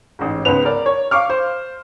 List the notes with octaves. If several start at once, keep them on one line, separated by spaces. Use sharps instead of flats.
A1 G#2
C#2 G#2 B3 B4 F7
A#4 D5
C#5
F5 C#6 D6 F6
C5